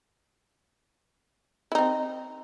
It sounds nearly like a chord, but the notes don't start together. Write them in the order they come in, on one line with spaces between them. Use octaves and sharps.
E4 D#4 C4